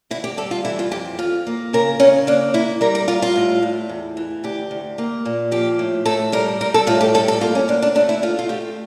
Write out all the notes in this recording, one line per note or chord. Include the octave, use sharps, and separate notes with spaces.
D2 E4
G4
G3 A4
F4
E3 E4
F4
F2 G4
F2 F4
A#3
C#3 A#4
C#3 C#4
A#3 D4
A#3 E4
G3 A#4
A#4
G3 F4
F4
A2
A2
E2
E3
D2 G4
D2
A#3
A#2
F3 G4
A2
A2 A4
G3 A#4
G3 A#4
A4
A2 F4
G4
G3 A4
A4
A#3 F4
C#4
D2 D4
D4
A3 D4
E4
A3 F4
F4
A3 G4